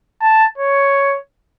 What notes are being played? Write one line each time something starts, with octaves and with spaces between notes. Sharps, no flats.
A5
C#5